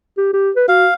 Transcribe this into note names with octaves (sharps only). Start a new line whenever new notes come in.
G4
G4
B4
F#4 F5